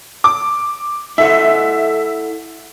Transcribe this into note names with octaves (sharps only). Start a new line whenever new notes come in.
D6
E4 A4 E5 F#5